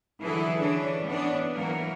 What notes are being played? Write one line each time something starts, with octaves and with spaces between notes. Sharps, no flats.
D3 E3 F#3 E4 G#4 A4
E3 C#4 D4
E3 B3 C#4 D4
E3 F#3 A#3 F#4 A#4